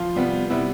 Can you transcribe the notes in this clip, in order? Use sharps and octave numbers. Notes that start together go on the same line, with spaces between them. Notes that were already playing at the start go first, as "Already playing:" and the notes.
Already playing: F3 F4
C3 G3 B3
C3 G3 B3 E4